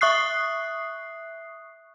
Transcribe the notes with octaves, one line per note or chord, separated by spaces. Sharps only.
E5 C#6 D#6 F#6 C7